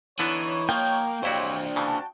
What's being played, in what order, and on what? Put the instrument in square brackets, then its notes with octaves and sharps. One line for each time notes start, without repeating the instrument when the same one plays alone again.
[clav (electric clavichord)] D3 B3 D4 [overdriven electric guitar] E3 [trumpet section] D#4 C#5
[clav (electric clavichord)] F3 [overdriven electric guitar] A#3 [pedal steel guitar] G5
[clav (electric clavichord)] F2 E4 F#4 [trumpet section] C4 G4 C#5 [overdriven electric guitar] D4 C5
[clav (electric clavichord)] C#3 E3 [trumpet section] F#4 A5